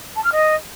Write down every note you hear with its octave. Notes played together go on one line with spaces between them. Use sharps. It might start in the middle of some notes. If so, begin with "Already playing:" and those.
A5
F6
D#5